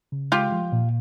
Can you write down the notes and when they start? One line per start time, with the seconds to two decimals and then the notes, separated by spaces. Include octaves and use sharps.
0.12 C#3
0.32 G#3 F4 G4
0.52 F3
0.72 A#2